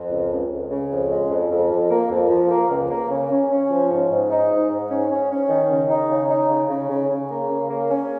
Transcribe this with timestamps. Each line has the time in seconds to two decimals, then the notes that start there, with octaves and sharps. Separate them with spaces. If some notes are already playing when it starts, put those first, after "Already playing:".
Already playing: F2
0.10 C#2
0.31 C#2
0.51 C#2
0.71 C#3
0.91 F2
1.10 G#3
1.30 F2
1.51 F2
1.71 F2
1.90 A#3
2.10 F2
2.30 F3
2.50 A#3
2.70 C#2
2.89 A#3
3.10 C#3
3.30 C#4
3.50 C#4
3.70 F3
3.90 G#2
4.10 G#2
4.29 D#4
4.50 G#2
4.70 G#2
4.89 C#4
5.10 C#4
5.30 C#4
5.49 D#3
5.69 C#3
5.89 D#4
6.10 C#3
6.29 D#4
6.50 C#3
6.69 C#3
6.89 C#3
7.09 C#3
7.29 A#3
7.49 C#3
7.69 A#3
7.89 C#4